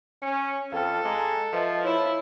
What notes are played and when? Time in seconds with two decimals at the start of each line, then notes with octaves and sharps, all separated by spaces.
0.22 C#4 C#7
0.72 F2 A4 F5 G5 F6
1.05 G#3 A#5 D6
1.53 F3 B4 D#5 E5
1.84 E4 C#5 E7